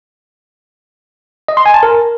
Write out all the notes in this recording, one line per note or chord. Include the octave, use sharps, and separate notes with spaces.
D#5
C6
G#5
A5
A#4